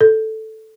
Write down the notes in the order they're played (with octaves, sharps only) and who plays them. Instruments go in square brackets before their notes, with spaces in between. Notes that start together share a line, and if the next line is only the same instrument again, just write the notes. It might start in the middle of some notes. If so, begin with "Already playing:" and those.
[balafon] A4